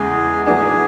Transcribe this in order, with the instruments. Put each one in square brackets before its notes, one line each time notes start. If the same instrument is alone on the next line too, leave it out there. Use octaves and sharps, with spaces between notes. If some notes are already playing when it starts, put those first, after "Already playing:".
Already playing: [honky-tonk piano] E2 C#3 E3 G#3 [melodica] G#4
[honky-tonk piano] A2 F#3 B3 D4 [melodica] G#4